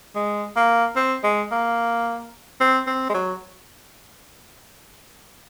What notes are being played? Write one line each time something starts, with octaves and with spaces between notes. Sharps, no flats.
G#3
A#3
C4
G#3
A#3
C4
C4
G#3
F#3